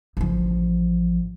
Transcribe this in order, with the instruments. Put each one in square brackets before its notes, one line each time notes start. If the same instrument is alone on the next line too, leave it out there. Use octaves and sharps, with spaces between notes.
[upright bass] A1 F3